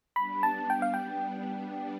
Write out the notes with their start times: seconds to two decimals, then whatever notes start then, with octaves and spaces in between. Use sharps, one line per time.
0.16 G3 B3 D4 B5
0.43 A5
0.70 G5
0.82 F5
0.94 G5